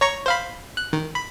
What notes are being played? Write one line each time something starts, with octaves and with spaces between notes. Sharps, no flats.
C#5 A#5 C#6
C5 F5 B5
F#6
D#3
B5